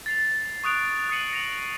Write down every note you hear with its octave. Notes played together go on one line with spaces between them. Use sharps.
A6 C7 F7
C#6 D#6 F#6 D7 F7
D#6 F#6 C7 C#7 D#7 F#7
A#6 F7 F#7